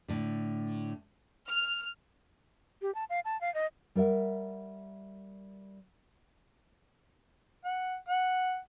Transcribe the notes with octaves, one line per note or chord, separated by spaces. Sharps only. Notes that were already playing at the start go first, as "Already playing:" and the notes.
A2 D3
F6
G4
A5
F5
A5
F5
D#5
G3 A#4 C#5 E5 F#5
F#5
F#5